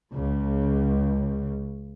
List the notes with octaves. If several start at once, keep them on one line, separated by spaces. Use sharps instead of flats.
C#2 C#3